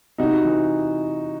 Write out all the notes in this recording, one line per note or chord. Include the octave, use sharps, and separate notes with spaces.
C3 D#4 F#4
E3